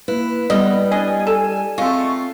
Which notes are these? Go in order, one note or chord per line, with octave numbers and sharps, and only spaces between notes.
A#3 E4 B4
G3 B3 D#5
D4 D5 D#5 G#5
A4
G#3 A3 C4 F4 C#6